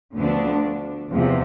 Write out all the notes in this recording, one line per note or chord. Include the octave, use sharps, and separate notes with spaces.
D2 D3 F3 B3 D4
E2 C3 F3